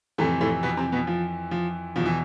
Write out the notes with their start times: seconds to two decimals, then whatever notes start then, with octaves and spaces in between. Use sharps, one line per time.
0.18 F2 A2 C3 E3 A3
0.41 A2 A3
0.63 B2 B3
0.77 C3 C4
0.92 B2 B3
1.07 F3
1.51 F3
1.96 E2 B2 F3
2.06 E3